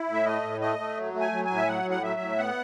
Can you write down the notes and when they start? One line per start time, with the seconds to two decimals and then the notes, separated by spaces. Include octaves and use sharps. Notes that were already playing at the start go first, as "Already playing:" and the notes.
Already playing: E4
0.08 A2
0.13 E5
0.25 A3 D#5
0.44 A2
0.61 A3 D#5
0.79 A3
0.97 F#3
1.14 A3
1.21 G#5
1.32 F#3
1.44 G#5
1.50 A2
1.57 E5
1.67 F#3 F#5
1.85 A2
1.90 F#5
2.03 F#3 E5
2.21 A2
2.38 B3 F#5